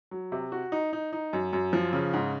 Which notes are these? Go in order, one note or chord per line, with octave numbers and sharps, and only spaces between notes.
F#3
C3
F#4
D#4
D#4
D#4
F#2
F#2
F3
C#3
G#2